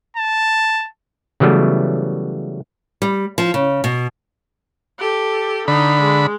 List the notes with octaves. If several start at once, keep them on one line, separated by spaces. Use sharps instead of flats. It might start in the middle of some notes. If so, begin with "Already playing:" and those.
A5
C#3 E3 F#3 G3 A3 B3
G3
F3
C#3
B2
G4 A4
D3 D#4 B5
G#3